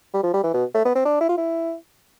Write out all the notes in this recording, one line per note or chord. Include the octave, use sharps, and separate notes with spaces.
G3
F3
G3
E3
B2
A3
B3
C4
D4
E4
F4
E4